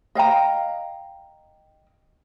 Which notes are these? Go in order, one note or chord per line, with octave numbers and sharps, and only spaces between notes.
D#5 F5 G5 A#5